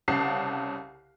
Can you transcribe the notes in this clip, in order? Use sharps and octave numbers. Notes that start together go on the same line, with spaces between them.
C2 C#3 F#5 A5 C7